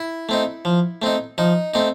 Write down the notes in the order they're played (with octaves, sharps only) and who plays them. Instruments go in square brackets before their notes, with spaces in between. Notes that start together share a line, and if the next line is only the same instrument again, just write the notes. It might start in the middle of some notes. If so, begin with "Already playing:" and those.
Already playing: [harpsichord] E4
A3 C4 D#4
F3
A3 C4 D#4
F3 D#4
A3 C4 D#4